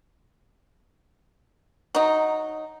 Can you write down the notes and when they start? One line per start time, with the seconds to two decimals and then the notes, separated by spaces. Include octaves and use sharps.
1.95 F#3 D#4